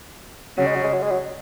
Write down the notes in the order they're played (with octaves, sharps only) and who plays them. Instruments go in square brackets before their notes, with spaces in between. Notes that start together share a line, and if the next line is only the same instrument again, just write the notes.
[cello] C#3 [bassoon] F#3
[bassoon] G#3
F#3
G#3
F#3
G#3
F#3